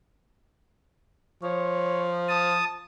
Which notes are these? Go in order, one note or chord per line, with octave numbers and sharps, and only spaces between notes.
F3 C#5
A5 D#6